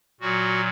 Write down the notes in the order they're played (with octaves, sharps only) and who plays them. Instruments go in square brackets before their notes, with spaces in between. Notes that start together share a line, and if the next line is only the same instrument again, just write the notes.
[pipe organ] A#2 F#3 F#4